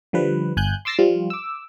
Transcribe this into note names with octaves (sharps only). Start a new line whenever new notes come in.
D3 F3 G3 B4
G1 G#5 F#6 G6
C6 D6 E6 A6 A#6 C7
F3 G3 F4
D6 E6